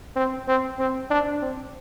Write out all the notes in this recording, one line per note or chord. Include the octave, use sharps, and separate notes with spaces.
C4
C4
C4
D4
C4